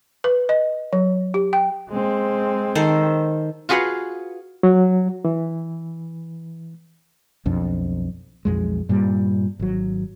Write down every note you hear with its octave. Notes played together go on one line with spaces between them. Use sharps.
B4
D#5
F#3
G4
G5
G#3 C4
D#3 A4 C5
F4 F#4 G#4 B4 F5 F#5
F#3
E3
B1 F2 D4
B1 F2 G#3
G2 A#2 G3
G#1 F#3